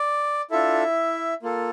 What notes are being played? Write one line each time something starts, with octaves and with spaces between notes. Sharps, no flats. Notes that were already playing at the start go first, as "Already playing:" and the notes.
Already playing: D5
D4 E4 F4 A4 E5
A#3 F4 A4